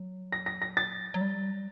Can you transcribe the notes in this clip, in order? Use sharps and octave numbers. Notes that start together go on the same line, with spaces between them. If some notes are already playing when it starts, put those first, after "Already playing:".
Already playing: F#3
A#6
A#6
A#6
A6
F#3
G3